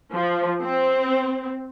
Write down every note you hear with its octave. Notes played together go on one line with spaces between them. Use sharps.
F3
C4